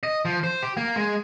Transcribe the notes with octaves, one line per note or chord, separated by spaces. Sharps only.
D#5
F3
C5
G4
A#3
G#3